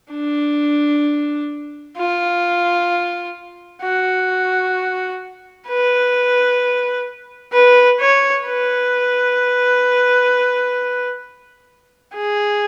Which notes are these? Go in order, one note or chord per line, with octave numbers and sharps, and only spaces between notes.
D4
F4
F#4
B4
B4
C#5
B4
G#4